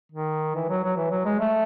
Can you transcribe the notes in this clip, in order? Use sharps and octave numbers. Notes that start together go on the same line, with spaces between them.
D#3
E3
F#3
F#3
E3
F#3
G#3
A3